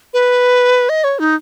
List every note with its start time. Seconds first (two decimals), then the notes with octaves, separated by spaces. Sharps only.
0.14 B4
0.89 D#5
1.04 C#5
1.19 D#4